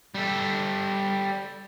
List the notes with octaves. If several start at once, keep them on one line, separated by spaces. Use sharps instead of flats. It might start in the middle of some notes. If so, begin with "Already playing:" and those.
G3 A4